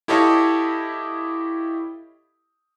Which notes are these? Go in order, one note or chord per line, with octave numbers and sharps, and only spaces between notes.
E4 G4 A4 C#5 D#5 F5